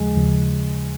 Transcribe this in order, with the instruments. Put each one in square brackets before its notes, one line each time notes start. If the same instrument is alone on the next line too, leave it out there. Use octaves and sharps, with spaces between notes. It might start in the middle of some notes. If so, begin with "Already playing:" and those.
Already playing: [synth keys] D#2 C#3 F3 [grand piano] G#3
[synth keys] D#2 C#3 F3